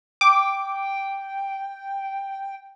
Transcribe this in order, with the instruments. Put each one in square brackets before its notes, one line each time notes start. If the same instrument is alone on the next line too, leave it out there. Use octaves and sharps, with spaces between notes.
[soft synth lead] G5 [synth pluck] D6